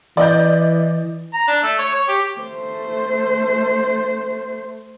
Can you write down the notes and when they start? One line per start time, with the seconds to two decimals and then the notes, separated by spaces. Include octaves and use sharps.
0.17 E3 D5 D#5 G6
1.34 A#5
1.48 D4
1.63 A3
1.79 C#5
1.94 C#5
2.08 G4
2.39 A3 C5